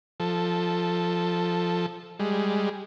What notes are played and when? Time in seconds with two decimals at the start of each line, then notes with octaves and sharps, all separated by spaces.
0.20 F3 A4
2.20 G3 G#3